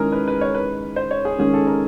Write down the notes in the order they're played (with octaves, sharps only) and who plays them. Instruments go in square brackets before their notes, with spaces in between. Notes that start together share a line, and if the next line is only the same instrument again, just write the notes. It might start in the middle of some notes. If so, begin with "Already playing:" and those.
Already playing: [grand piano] D#3 G#3 C#4 E4 [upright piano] G#4 A#4
[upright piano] B4
B4
C#5
B4
C5
C#5
G#4
[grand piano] D#3 G#3 C#4 [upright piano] G#4
[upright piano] A4
A#4